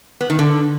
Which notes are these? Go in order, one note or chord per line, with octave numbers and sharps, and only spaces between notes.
B3
D#3
D3